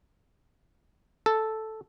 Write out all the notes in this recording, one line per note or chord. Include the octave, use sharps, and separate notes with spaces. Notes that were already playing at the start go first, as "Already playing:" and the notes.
A4